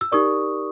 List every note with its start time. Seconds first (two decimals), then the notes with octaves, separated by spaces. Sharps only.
0.01 E6
0.12 D#4 G4 A#4 D5 C#6 D#6